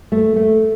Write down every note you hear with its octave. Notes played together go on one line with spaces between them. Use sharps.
A3
A3